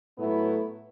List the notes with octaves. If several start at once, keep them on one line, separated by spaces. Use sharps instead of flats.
A2 F#3 A3 B3 E4